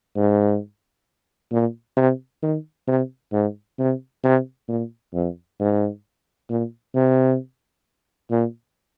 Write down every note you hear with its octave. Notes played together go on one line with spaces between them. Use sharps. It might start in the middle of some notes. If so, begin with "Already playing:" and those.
G#2
A#2
C3
D#3
C3
G#2
C3
C3
A#2
F2
G#2
A#2
C3
A#2